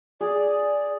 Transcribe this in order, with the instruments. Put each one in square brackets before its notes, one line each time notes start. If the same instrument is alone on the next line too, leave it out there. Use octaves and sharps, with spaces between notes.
[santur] G#4 [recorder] D5